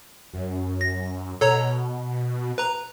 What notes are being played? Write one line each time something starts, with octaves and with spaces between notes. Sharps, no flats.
F#2
A#6
B2 A4 C#5 A#5
B4 A#5